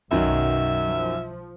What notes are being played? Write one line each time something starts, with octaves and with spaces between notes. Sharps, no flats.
B1 F#2 D#3 F#3 E5
F3